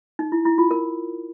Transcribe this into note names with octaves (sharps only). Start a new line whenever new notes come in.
D#4
E4
E4
F4
A#4